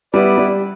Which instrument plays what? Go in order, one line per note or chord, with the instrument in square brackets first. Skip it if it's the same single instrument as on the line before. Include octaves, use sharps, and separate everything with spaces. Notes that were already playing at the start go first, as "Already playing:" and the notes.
[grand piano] G3 [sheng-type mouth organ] B3 E4 B4 D5
[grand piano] G3